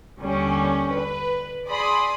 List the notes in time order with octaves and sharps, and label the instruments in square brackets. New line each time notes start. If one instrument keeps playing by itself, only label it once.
[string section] D#2 D3 G3 C#4
B4
G#4 D5 B5 C6 D#6